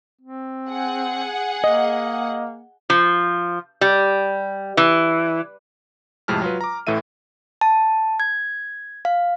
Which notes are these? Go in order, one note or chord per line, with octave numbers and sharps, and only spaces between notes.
C4
G#4 F#5
A#3 D#5
F3
G3
E3
F2 A2 C3 G#3 A5 F6
F#3 F4 B4
A#5 D6
A1 A2 E3 A4 E5 D#7
A5
G#6
F5